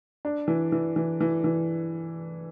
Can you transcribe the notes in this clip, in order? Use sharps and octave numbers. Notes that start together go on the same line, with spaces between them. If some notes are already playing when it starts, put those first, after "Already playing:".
D4
E3
E3
E3
E3
E3